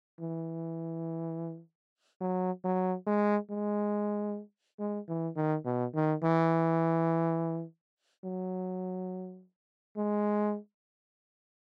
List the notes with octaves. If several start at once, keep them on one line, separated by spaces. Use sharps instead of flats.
E3
F#3
F#3
G#3
G#3
G#3
E3
D#3
B2
D#3
E3
F#3
G#3